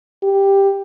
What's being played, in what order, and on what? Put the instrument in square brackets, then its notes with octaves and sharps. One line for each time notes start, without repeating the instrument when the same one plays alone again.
[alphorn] G4